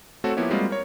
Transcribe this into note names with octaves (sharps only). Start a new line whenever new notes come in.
A3 C4 F#4 A4 C#5
F3 A#3 B3 E4 G4 C#5
G3 G#3 A#3 C4 F4 F#4
A#4 C#5